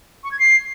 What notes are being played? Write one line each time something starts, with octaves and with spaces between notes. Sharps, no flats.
C#6
G#6
C7